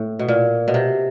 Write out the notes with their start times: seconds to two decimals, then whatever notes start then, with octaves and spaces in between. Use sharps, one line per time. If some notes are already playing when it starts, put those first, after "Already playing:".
Already playing: A2
0.19 B2
0.28 A#2
0.68 B2
0.74 C3